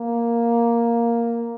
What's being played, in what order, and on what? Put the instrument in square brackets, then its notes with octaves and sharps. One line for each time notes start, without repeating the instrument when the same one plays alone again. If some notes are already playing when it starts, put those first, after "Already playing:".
Already playing: [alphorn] A#3